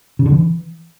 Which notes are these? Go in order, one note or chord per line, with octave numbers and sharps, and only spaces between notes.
C#3
D3
E3